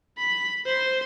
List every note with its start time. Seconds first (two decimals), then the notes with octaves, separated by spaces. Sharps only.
0.18 B5
0.66 C5